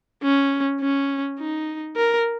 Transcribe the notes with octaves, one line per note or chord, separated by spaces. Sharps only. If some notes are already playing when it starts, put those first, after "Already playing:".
C#4
C#4
D#4
A#4